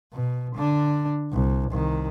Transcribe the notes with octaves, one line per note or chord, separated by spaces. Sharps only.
B2
D3 D4
C2
C2 D#3